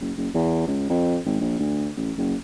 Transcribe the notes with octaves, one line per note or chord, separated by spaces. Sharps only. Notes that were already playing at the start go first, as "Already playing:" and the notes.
F#1
F#1
E2
C#2
F2
G#1
A#1
D2
A1
F#1